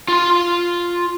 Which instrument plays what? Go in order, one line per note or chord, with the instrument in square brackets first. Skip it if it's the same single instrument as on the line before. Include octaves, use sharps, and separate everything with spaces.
[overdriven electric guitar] F4 C6